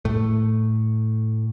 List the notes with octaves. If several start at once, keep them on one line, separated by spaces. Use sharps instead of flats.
A2 A3